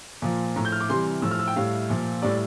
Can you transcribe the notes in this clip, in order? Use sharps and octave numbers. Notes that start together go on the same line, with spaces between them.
A#2 F3
A2 F3 A#5
G6
F6
D6
C3 E3 G3 C6
A2 F3 E6
F6
E6
G5
A2 G3 F5
A#2 F3
A2 G3 D5